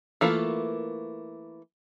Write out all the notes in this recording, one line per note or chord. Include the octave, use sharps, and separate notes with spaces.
E3 A3 A#3 F4